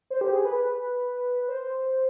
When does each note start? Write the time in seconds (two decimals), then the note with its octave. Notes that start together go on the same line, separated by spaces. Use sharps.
0.10 C5
0.21 G4
0.33 G#4
0.45 B4
1.48 C5